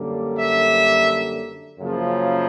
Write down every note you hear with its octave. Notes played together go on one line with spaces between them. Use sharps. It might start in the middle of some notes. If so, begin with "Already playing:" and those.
Already playing: F#2 D3 G3 A#3
E5
F#2 C#3 F3 A#3